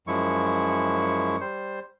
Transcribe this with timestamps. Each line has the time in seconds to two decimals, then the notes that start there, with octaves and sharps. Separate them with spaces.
0.07 F#2 F3 G#3 E4 C#6
1.41 G3 C5